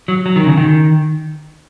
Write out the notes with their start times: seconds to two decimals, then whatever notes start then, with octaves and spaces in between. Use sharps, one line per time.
0.08 F#3
0.26 F#3
0.36 D#3
0.46 C#3
0.57 D#3